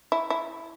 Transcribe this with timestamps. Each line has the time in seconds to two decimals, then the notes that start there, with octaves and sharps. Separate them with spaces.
0.12 E4
0.30 E4